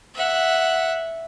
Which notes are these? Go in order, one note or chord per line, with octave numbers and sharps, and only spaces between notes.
E5 F#5